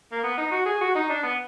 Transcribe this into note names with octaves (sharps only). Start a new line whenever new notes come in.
A#3
B3
D#4
F#4
G#4
F#4
D#4
D4
B3